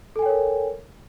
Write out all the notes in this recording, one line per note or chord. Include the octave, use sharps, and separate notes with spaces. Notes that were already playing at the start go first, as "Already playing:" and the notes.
A4 A#4 C#5 G5 G#5